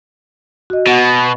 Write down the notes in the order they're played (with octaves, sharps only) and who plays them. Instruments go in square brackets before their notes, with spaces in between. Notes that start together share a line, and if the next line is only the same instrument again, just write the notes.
[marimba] F#4 D#5
[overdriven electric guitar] B2 [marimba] F#5